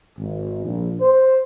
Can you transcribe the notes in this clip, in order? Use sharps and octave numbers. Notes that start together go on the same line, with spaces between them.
G#1
A#1
C5